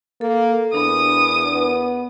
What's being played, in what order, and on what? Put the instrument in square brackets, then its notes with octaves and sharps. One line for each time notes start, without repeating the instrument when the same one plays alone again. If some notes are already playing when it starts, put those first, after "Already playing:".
[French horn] A#3 [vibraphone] A4
[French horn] E2 [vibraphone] D4 A#4 B5 [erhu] D#6
[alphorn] B3